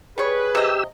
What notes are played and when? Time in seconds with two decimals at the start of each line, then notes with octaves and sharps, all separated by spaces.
0.18 G3 G#4 B4 C#5
0.55 C3 G4 D#5 E6